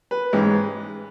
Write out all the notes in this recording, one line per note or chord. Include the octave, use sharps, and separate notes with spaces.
B4
A1 G#2 G#3